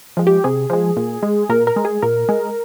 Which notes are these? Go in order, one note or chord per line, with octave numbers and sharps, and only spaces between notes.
F3 G#3
G4
C3 G#4
F3 G#3
A#2
G#3
A#2 A#4
A#4
G#3
G#4
A#2 A#4
G#3